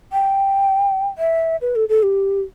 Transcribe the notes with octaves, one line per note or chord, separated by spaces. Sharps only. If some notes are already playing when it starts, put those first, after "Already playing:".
G5
E5
B4
A4
A4
G4